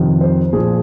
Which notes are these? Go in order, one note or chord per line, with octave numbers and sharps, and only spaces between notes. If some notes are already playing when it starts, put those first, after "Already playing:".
Already playing: F2 C3 D#3
C5
A#2 F3 G#4